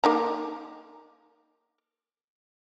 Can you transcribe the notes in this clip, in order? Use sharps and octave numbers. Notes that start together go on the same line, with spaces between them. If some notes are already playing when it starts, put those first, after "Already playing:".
A#3 D#4 A#5